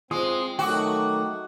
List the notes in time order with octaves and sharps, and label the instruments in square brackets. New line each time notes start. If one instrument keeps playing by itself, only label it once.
[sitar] G#3 [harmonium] C4 [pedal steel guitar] F4 D#6
[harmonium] D#3 F#3 A3 [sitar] F#4 [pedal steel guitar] G5 D6 D#6